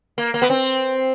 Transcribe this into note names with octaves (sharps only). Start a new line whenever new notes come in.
A#3
A#3
B3
C4